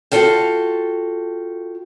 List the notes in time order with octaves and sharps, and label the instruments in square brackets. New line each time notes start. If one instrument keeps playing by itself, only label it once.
[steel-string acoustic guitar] F4 F#4 A4 F5 G5